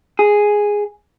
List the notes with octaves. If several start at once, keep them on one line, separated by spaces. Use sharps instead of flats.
G#4